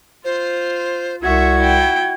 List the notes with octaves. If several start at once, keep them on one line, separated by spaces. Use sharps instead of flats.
F4 C5
C2 F#4 E5 C#6 G#6
E4 G5